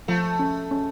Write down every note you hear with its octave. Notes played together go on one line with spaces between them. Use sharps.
F3 A3
C#4
C#4